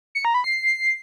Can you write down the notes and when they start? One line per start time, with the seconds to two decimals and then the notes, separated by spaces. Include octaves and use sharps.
0.15 C#7
0.25 A#5
0.34 B5
0.44 C7